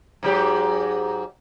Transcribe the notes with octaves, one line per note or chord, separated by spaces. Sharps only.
G#2 F#3 G4